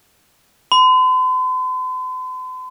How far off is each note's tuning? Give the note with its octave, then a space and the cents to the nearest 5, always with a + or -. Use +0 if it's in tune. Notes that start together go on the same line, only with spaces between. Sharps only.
C6 -45